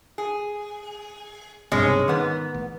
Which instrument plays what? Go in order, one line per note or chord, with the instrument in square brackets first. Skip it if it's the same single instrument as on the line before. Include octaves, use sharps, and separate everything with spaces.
[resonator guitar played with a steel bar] G#4
[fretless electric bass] B1 G2 C3 [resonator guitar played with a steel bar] G#3 C#4
[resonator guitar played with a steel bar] G#2 B3 [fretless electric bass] D#3
[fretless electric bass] A1